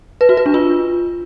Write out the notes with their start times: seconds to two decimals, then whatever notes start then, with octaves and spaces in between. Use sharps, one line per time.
0.21 B4
0.29 F#4
0.37 B4
0.46 D4
0.54 F4